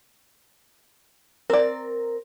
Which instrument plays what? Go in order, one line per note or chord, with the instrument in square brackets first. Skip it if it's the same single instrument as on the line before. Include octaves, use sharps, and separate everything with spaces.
[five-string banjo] C4 D5 [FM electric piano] A#4